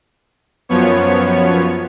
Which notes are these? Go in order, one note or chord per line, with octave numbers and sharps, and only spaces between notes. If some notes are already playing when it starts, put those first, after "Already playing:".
F#2 F3 B3 C#5